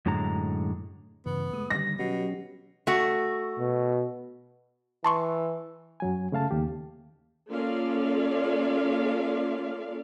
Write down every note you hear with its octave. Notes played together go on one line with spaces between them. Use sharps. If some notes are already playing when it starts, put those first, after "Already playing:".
F#2 A2 D3 G#3 A#5
G2 C#3 E3 B3
G#3 A3 D#6
D3 D#3 G3 A#6
B2 F#3 C#4 G4
A3 F#4
B2
E3 A5 C6 C#6
F#2 F#3 G#5
C#3 A3 F5 A5
D#2 G4
A#3 C#4 F4 A4 D5 F5